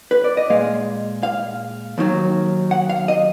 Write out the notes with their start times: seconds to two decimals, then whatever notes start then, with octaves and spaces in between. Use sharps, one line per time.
0.11 B4
0.24 D5
0.37 D#5
0.50 A#2 G#3 F5
1.23 F5
1.98 D#2 D#3 F#3
2.71 F#5
2.89 F5
3.08 D#5